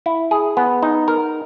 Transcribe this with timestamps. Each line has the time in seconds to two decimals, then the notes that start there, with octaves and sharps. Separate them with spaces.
0.06 E4
0.31 G#4
0.57 B3
0.83 D#4
1.08 A#4